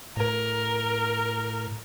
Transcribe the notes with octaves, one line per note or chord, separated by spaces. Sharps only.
A2 A#4